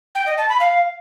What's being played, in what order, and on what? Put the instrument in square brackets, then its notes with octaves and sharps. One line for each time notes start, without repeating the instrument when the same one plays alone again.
[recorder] G5
D#5
A5
B5
F5